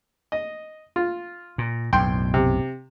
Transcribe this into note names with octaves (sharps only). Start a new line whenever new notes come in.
D#5
F4
A#2
B1 F#2 A2 G5 C6
C3